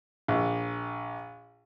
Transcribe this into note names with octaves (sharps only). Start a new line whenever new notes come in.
A#1